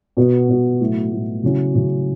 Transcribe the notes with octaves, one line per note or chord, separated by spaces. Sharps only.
B2 B3 F#4
B2 B3 F#4
A2 F#3 A3 E4
A2 F#3 A3 E4
C#3 F#3 C#4 E4
C#3 F#3 C#4 E4